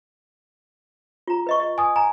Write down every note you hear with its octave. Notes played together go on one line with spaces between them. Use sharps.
F4 A#5
B4 D#5 C#6
D#5
G#5 D#6
G#5 A#5